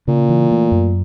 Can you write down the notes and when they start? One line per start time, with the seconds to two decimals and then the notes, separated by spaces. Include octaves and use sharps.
0.08 A#2 C#3
0.29 E3
0.51 A3
0.71 F#2